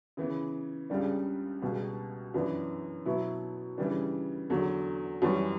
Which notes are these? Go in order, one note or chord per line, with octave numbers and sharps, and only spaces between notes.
C#3 E3 B3
C#2 C#3 G3 D4
C#2 B2 G3
F#2 E3 B3 D4
B2 F#3 B3 E4
C#3 E3 G3 D4
E2 D3 F#3
F#2 E3 G3 C#4